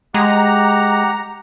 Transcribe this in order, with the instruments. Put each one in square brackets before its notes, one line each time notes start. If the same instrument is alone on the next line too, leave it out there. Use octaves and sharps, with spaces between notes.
[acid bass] G#3 [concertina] G4 F#5 [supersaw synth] A#5